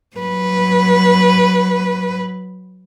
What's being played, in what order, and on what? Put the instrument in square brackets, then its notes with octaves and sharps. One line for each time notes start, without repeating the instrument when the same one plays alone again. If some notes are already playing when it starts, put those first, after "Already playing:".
[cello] F#3 B4